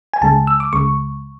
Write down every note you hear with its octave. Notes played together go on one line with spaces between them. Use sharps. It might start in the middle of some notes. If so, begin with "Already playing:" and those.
G#5
C#2 C#3 G#3 A5
E6
D6
C#2 C#3 G#3 C#6